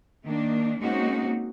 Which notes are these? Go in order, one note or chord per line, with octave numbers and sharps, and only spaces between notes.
D#3 A#3 D4
G#3 A#3 C4 C#4 D#4 F#4